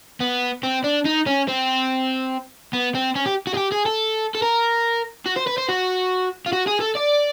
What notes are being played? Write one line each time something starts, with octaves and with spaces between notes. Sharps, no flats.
B3
C4
D4
D#4
C#4
C4
B3
C4
C#4
G4
F#4
G#4
G4
G#4
A4
A4
A#4
F#4
C5
B4
C5
F#4
F4
F#4
G#4
A4
D5